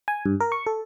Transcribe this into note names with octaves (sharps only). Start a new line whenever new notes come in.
G#5
G2
A#4
C#6
A4